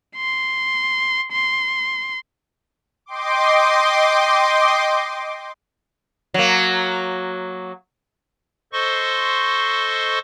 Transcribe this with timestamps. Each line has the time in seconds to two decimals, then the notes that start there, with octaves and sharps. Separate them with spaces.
0.16 C6
1.32 C6
3.06 D#5 G5 C6 D6
6.34 F#3 A#3
8.73 A4 C5 D#5 C6 C#6